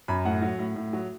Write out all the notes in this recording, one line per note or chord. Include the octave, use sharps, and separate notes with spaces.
F#2 B5
A2 F#5
F#3
A2
A2
F#3